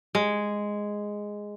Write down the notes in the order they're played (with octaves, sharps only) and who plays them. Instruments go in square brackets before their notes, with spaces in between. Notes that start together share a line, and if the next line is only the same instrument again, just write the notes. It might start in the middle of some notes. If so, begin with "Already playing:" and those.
[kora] G#3